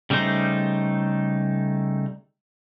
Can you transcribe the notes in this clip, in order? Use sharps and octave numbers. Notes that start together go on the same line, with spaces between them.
C#3 G3 A3 D#4 C5